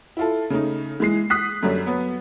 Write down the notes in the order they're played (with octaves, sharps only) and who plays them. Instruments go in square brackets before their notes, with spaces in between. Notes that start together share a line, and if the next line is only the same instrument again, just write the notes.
[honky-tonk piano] E4 F4 A4
C#3 A3 D#4
E3 G#3 C7
D#6 F#6 B6 C7
F#2 D3 F#3 G3
F#3 B3